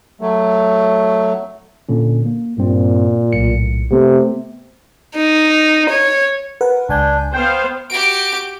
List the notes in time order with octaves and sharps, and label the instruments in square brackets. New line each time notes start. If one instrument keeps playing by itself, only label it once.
[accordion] F#3 A3
[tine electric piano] A#2 D3 C#4
A#3
[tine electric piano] G2 C4 [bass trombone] A#2
[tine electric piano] B1 A2 C#7
[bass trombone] C3 [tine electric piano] A3 B3
[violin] D#4
C#5
[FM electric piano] A#4 B4 F#5
[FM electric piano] C#2 G#5 G6 [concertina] D4
[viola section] B3 C5 F5 [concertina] G5 [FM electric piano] G6
[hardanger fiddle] F#4 G4 [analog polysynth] D7